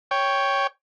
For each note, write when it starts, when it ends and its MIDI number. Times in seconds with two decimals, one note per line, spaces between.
0.11 0.67 73
0.11 0.67 79